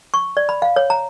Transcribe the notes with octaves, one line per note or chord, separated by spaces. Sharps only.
C#6
D5
B5
F5
C#5
A#5